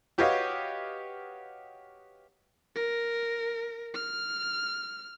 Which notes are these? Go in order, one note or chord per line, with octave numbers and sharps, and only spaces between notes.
F#4 G4 B4 C#5 D#5 F5
A#4
F6